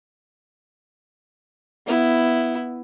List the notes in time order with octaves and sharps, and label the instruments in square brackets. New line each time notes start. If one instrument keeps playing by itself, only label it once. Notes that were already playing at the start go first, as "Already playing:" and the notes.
[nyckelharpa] B3 E4